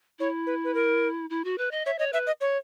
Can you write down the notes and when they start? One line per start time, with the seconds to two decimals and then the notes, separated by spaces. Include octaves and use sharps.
0.19 E4 C#5
0.47 B4
0.64 B4
0.74 A#4
1.30 E4
1.44 F#4
1.58 B4
1.71 D#5
1.85 C#5 E5
1.99 C#5 D#5
2.13 B4 E5
2.27 D#5
2.41 C#5